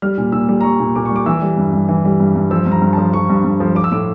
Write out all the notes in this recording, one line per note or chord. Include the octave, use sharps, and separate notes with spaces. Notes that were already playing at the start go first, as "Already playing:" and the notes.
G3 F6
A#2
A#2 E6
G3
A#5
G3 C#6
A#2
A#2 D6
C#6
G3
D6
E3 E6
G3
G2
G2
E3
G3
G2
G2
F3 E6
G2 A#5
G2
F3 A5
F3 C#6
G2
G2
F3
F3 D6
E6
A2 D6